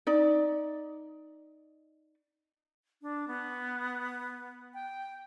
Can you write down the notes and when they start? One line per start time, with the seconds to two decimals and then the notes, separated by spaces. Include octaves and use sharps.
0.07 D#4 D5
3.02 D4
3.28 B3
4.74 G5